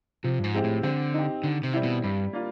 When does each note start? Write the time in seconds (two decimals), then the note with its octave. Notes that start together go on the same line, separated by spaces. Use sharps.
0.24 C3 F3
0.39 G2
0.44 G#2
0.54 G#3 C4 E4 G4
0.64 A2
0.83 D3 C4
1.14 D#4 G4
1.43 D3 D#3
1.63 C3
1.73 G3 C4 E4
1.83 B2
2.04 G2 G3
2.33 A#3 D4 F4